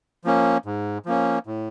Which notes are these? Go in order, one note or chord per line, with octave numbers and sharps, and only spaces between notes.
F3 A#3 C#4
G#2
F3 A#3 C#4
A2